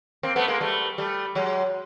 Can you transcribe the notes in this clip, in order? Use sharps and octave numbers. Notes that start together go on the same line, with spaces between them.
A#3 C4
A3 B3
G#3 A#3
G3 A3
G3 A3
F#3 G#3